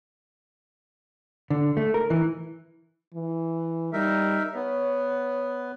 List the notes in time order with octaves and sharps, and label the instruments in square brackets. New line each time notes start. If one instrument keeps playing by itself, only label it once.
[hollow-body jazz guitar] D3
A3
A#4
E3
[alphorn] E3
[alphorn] G3 [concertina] D#4 A#4 E5
[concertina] B3 [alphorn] C#5